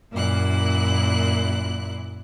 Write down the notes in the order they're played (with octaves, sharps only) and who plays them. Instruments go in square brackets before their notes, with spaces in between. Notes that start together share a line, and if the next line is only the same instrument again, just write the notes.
[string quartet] F#2 A#2 A#3 E4 F#6